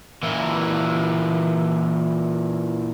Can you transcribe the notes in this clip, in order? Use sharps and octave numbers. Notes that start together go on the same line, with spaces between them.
A#2 E3